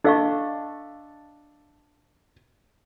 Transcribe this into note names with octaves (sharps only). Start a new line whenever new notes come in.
D4 A4 D#5 F5 C#6